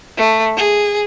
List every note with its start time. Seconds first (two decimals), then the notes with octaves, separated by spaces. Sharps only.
0.17 A3
0.57 G#4